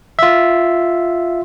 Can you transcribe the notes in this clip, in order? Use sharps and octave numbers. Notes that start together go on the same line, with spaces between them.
F4 E5